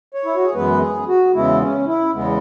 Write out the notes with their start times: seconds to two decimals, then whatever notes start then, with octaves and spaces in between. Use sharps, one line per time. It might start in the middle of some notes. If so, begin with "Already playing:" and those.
0.14 C#5
0.25 E4
0.35 F#4
0.44 G#4
0.54 F#2 E3 G#3 B3 B4
0.80 G#4
1.08 F#4
1.34 E2 C#3 G#3 B3 E4
1.61 C#4
1.87 E4
2.14 E2 C#3 G#3 B3